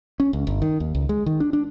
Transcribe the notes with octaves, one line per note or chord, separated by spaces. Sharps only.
C#4
C#2
G1
D#3
D#2
C#2
G#3
D#3
D4
D4